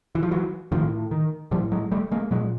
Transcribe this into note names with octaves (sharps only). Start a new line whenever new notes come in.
E3
F3
E3 F#3
A2 D#3 F3
D#3
A2 F3 G3
F#3 G#3
G3 A3
G#3 A#3
A#2 F#3 G#3